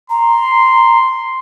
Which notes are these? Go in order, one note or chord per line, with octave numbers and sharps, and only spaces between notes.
A#5 C6